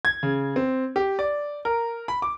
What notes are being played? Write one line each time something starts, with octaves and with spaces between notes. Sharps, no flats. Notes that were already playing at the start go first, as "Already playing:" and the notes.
G#6
C#3
C4
G4
D5
A#4
B5
D6